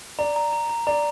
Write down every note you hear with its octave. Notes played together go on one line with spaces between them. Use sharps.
D5 A#5
A#5
A#5
A#5
D5 A#5